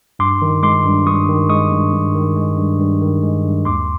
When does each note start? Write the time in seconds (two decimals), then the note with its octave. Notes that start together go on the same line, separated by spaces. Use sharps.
0.19 G2 C6 D6
0.42 D#3
0.63 G#3 C6 D6
0.85 G2
1.06 G2 C#6 D#6
1.28 D#3
1.50 G#3 C#6 D#6
1.72 G2
1.93 G2
2.15 D#3
2.36 G#3
2.57 G2
2.79 G2
3.01 D#3
3.23 G#3
3.45 G2
3.65 D#2 C6 D6